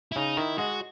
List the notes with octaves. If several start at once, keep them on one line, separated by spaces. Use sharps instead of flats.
E4
C#3 D#4
D#3 E4
G#3 F#4